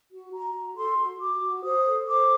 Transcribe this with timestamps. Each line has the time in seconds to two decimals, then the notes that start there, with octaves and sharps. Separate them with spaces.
0.11 F#4
0.32 F#4 A#5
0.54 F#4
0.76 A4 C6
0.98 F#4
1.19 F#4 D6
1.42 F#4
1.63 C5 D#6
1.86 A4
2.07 C5 D6